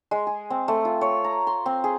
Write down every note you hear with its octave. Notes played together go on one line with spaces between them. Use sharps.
G#3
G#4
C4
A3
F4
C#5
A#5
C6
C4
G#4